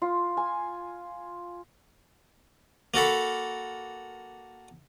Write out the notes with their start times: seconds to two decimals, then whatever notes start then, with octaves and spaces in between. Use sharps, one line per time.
0.02 F4
0.37 G#5
2.94 A#3 F#4 A4 B5